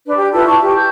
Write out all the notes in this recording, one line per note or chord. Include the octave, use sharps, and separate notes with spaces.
D4 B4
G4
E4 F4 A4 B4
A5 C#6
G4
G6